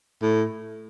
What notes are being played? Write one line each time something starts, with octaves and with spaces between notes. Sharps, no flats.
A2